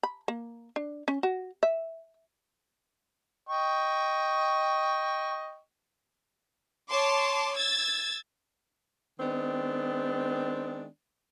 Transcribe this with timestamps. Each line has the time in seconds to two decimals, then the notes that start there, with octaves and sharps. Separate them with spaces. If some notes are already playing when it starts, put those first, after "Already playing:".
0.03 B5
0.28 A#3
0.76 D4
1.08 C#4
1.23 F#4
1.63 E5
3.48 D#5 G5 C#6
6.89 C#5 A5 C6 D6
7.56 E6 G#6 A6
9.18 D#3 G#3 B3 C4 D4